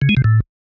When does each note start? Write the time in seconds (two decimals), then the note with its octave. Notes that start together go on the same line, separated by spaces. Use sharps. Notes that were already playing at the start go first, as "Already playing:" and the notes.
0.02 C#3
0.09 G#3
0.17 C3
0.24 A2